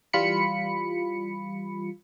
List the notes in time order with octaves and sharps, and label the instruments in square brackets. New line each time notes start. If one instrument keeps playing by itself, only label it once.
[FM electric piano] E3 G3 F4 B5 C#7